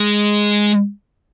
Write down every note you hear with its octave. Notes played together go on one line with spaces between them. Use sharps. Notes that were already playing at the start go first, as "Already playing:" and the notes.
Already playing: G#3